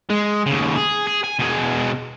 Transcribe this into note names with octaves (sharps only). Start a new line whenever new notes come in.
G#3
D#2 C#3
G#4
G#4
G#5
B2 G#4